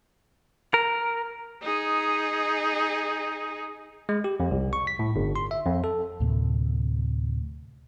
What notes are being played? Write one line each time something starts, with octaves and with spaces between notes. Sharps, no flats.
A#4
D#4 G#4
G#3
G4
F2
C2
C#6
B6
A2
G1
C6
E5
F2
A4
D2 A2 C3 A#3